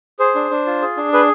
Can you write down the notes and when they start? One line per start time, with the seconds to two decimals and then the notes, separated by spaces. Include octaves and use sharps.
0.19 G#4 C5
0.35 D4
0.51 D4
0.66 F4
0.82 G#4
0.97 D4
1.13 G#4 B4